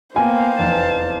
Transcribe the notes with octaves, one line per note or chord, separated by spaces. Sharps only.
A#3 B3 C5 F5 G5 G#5
F1 E2 A5